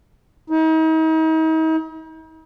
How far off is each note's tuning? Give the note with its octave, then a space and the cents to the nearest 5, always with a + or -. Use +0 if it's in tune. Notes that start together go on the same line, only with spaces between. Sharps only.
D#4 +40